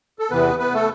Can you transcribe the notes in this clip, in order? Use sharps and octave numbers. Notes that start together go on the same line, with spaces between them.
A4
E2 C3 E3 B3 B4
B3 B4
A3 A4